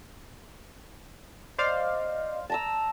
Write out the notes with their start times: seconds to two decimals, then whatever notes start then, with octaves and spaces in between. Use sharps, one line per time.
1.59 C5 D5 D#5 F5
2.50 A5 A#5 E6